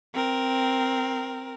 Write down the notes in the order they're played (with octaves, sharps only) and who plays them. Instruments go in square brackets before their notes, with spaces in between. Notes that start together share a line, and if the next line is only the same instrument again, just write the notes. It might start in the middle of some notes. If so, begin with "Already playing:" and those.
[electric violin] C4 A#4